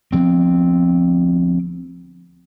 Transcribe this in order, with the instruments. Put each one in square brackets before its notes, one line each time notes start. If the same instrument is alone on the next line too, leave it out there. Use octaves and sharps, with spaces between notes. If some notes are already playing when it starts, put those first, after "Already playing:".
[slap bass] D2 F3 B3 [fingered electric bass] C4